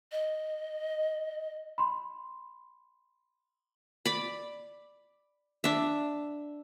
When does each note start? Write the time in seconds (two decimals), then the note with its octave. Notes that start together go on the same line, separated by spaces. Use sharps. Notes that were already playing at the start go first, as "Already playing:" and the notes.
0.12 D#5
1.78 B5 C6
4.05 D5 B5
5.64 D4 E5